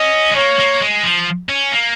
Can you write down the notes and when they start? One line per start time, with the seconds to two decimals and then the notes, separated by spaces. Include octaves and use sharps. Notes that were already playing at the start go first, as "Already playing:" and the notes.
Already playing: C#4 D#5
0.31 G#3
0.36 A#3 C#5
0.59 A#3
0.82 G#3
1.03 F3
1.49 C#4
1.72 A#3